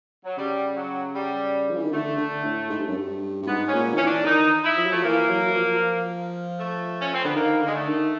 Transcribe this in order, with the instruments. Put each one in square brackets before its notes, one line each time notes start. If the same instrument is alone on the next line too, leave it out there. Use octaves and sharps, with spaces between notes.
[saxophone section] F#3
[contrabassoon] C#3 [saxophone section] G3
[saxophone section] F#3
G3
[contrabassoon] F3
E3
D#3
[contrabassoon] D3 [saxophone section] A3
[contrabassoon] D3
A2
G#2
G2
F#2
G2
G2
[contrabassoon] G#2 [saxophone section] B3
[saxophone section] C#4
[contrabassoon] A#2
D#3
[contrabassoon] E3 [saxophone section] C#4
[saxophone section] D4
[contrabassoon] D#3 [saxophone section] D#4
[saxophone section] E4
[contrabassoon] F3
F#3
[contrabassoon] F3 [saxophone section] A3
[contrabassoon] E3 [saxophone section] A#3
[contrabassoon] F#3
F3
[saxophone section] A3
C#4
C4
[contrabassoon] D3 [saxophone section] B3
[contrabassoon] D#3 [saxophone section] A#3
[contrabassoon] D3 [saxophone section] G#3
[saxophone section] A3
[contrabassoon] D#3